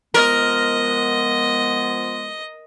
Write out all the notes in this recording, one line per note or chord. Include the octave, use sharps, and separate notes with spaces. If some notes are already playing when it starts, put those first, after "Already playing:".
F3 G#3 B3 A#4 D#5